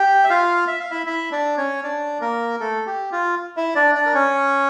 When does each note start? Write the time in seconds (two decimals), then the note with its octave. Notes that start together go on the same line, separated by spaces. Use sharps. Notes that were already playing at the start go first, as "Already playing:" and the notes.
Already playing: G4 G5
0.24 E5
0.30 F4 F5
0.68 E5
0.80 F5
0.91 E4 E5
1.06 E4 E5
1.31 D4 D5
1.57 C#4 C#5
1.84 D4 D5
2.21 A#3 A#4
2.60 A3 A4
2.86 G4
3.12 F4
3.57 E4 E5
3.75 D4 D5
3.95 D4 D5
4.06 A#4
4.14 C#4 C#5